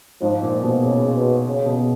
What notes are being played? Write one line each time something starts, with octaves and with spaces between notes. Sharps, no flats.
G#2 F3
A#2
B2
C#3
B2
C#3
B2